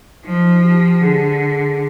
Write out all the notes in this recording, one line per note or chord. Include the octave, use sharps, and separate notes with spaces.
F3 D#4
G4
D3 G#4